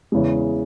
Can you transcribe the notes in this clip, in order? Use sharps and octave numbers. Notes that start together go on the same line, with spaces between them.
E2 C#3 E3 G#3